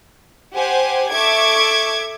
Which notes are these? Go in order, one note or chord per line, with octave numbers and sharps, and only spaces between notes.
G4 C5 F#5 G#5
A4 E5 C#6 D6 G#6